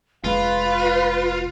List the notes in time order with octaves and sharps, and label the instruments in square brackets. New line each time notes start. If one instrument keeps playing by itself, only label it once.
[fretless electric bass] F1 G#3 [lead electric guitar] F4 [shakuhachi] B4 [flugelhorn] F5